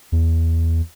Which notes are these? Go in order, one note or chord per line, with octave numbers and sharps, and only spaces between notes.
E2